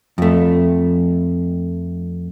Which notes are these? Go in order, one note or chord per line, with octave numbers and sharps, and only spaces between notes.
F2 A3